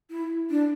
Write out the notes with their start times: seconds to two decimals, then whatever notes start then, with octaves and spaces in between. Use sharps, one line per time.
0.10 E4
0.50 D4